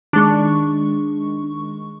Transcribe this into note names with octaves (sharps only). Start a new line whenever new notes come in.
D#3 G#3 D4 C#6